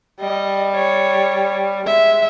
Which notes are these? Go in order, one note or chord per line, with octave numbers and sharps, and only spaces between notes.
G3 D#5
C#5
G#3 E5